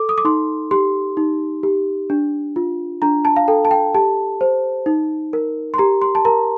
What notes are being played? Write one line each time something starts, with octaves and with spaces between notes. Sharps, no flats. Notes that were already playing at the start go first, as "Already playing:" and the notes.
Already playing: A4 D6
D#6
D6
D#4 C6
G4 C6
D#4
G4
D4
F4
D4 A#5
A5
F5
A4 G5
A5
G5
G4 A5
C5
D#4
A#4
C6
G4 A#5
C6
A5
A#4 A#5